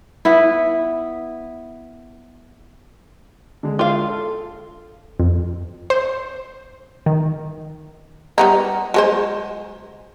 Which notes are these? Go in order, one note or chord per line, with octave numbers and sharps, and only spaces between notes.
B3 E4
D3 G#3
F4 F5
A4
F2
C5
D#3
G3 B3 D#4
F#3 G#3 C5